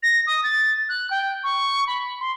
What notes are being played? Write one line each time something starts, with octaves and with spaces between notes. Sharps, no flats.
A#6
D#6
A6
F#6
G5
C#6
B5
C6